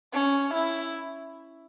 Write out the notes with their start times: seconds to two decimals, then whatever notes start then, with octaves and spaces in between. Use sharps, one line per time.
0.13 C#4
0.54 E4